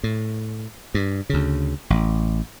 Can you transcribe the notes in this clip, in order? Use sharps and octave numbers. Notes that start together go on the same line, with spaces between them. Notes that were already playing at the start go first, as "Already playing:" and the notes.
A2
G2
D2 C#3
A1